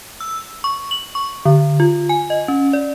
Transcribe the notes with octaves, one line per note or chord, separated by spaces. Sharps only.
E6
C#6
F#7
C#6
D3
F4
G#5
D#5
C#4
D5